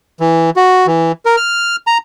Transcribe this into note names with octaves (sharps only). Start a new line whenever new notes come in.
E3
F#4
E3
A#4
F6
A#5